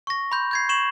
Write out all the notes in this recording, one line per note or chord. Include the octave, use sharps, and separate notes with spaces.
C#6 A#6
B5 C6 G6
G6 G#6 C7
C#6 E7 F#7